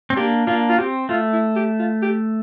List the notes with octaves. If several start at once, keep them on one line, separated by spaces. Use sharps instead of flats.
C4
A#3 D4 G4
A#3 D4 F4
F4
C4 G4
A3 F4
E4
G4
F4
G4